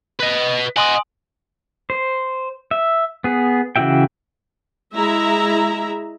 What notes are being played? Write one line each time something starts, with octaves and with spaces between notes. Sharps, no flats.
B4 D#5
D#5 F#5 G#5 C6 D#6
C5
E5
B3 G#4
C#3 E3 F#4 E5 G5
G#3 E4 E5 A#5